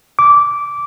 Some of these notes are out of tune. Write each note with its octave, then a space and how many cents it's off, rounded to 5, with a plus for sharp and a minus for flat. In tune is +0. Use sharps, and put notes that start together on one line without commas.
D6 -15